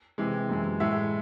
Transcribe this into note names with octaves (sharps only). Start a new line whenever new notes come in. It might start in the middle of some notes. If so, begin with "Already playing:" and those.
C3 E3 G#3
F#2 E3 G#3
A2 G#3 E5